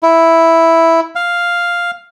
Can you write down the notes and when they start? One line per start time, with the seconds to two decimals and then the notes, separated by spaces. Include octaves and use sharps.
0.03 E4
1.15 F5